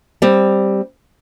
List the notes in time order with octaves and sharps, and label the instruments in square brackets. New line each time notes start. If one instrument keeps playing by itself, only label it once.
[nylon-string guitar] G3 C4